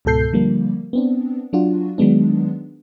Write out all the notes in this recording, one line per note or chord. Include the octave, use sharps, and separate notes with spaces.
C#2 G#2 B2 A4 G6 C7
D3 F3 G3 A#3
B3 C4 D4
F#3 D4 F4 F#4
D#3 F#3 G#3 B3 D4